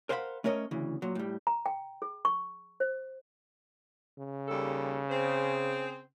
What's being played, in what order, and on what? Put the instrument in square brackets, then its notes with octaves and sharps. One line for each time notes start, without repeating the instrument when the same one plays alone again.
[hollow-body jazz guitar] A#4 C5 F5 F#5 G#5 B5
A3 C#4 A#4 C#5 D#5
D2 C#3 E3
A#2 F#3
A2 G3
[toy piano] A#5
G5
G#4
C#6
C5
[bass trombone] C#3
[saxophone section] D#2 G3 A4
C4 G#4 C5